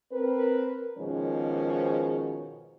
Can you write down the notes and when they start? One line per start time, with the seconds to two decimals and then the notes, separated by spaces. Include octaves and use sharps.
0.12 C4 A#4 B4
0.98 G#2 B2 D#3 F3 C#4 G#4